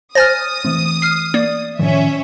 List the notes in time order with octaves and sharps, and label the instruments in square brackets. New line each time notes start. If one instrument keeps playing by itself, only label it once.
[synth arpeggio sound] C5 G#5 [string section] D#6 [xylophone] F6 A6 A#6
[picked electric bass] E3 A3 C4
[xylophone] F6 C7
[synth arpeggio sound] A#3 [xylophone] D5
[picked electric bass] A2 D#3 F3 [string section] C#4 E5